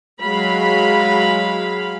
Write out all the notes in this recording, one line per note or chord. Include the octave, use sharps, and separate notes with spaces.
F#3 G#3 G#4 F5 B5